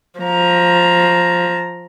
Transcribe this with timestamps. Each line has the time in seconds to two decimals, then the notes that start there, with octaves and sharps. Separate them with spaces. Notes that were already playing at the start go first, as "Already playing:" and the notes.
0.20 F3 A#5